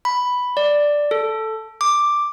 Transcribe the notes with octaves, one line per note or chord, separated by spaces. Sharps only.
B5
D5
A4
D6